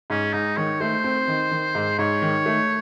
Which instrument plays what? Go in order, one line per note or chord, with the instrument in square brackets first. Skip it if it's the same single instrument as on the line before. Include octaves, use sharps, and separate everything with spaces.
[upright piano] G#2 [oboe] C#4
[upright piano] G#2 [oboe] D#4
[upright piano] D#3 [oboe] C#5
[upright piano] A3 [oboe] C5
[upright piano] C4
D#3
D#3
G#2
[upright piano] G#2 [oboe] C#5
[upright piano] D#3
A3